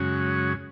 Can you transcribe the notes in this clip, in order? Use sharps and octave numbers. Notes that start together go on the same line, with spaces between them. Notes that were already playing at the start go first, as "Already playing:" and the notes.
Already playing: F#2 C#3 G#3 C#4 F#4